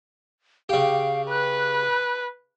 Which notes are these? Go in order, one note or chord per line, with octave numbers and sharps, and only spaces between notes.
C#3 G4 F5
B4 F#6